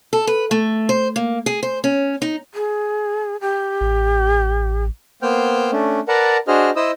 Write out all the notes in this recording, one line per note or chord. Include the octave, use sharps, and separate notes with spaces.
A4
B4
A3
C5
A#3
G#4
C5
C#4
D#4
G#4
G4
A1
A#3 B3 C5 G5 F6 G6
A3 C#4 D4
A#4 B4 D5 F#5 A5 A#5
D4 F#4 G#4 C5 D#5 F6
E4 C5 D#5 D#6 E6